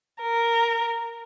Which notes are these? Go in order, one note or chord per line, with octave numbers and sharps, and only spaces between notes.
A#4